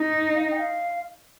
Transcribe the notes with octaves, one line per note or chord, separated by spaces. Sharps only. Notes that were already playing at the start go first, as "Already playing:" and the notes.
Already playing: D#4
F5
G5
F5